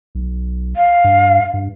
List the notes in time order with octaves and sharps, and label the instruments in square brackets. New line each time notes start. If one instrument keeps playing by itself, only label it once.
[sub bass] B1
[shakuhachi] F5
[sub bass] G2
G2